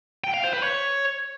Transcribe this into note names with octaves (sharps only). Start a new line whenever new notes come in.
G5
F5
C5
B4
C#5